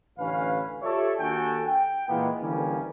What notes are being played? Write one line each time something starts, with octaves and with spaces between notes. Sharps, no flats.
A1 D3 C#4 B4 F5
F4 G4 A4 C#5 D5 E5
D#2 D4 F#4 A4 G5 G#5
G5
A#2 E3 G#3 A#3 B3
D3 E3 F3 G3 A#3 C#4